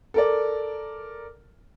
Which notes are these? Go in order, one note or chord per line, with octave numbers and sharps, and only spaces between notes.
A4 A#4 D5